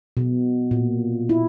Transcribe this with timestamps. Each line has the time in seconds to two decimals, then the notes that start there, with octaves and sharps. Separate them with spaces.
0.17 B2
0.71 A#2
1.29 E4